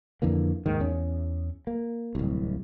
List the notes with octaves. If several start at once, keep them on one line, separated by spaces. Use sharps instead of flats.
F2 D3 E3 A#3
D#2 G#2 D#3
E2 C#4
A#3
D1 C2